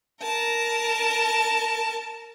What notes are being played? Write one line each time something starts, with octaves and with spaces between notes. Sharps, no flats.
A#4 A5